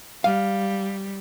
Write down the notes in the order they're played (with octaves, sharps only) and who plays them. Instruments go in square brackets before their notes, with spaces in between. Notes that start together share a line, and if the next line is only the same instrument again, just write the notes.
[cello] G3 [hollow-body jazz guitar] F5